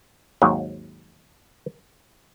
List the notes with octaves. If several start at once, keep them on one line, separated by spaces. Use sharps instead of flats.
D#2 G#2 F#3